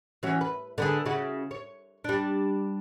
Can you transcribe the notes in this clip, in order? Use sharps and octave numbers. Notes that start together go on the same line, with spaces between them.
E3 C#4 F#4
B4
D3 B3 G#4
C#3 E4 F#4
C#5
G3 D4